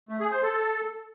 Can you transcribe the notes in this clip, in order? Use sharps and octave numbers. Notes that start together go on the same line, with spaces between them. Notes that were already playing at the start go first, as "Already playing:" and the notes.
A3
G#4
C5
A4